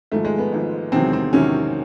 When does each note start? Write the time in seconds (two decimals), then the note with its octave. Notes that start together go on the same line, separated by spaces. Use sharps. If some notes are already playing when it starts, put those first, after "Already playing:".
0.12 G#1 G#2 F3 A3
0.25 G#3
0.38 B3
0.52 G#1 G#2 F3
0.92 E1 E2 C3 D#3 F#3 C4
1.13 C4
1.33 E1 E2 C3 D#3 F#3 C#4